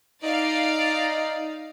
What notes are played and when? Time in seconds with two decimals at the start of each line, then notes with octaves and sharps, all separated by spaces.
0.23 D#4 D5 F5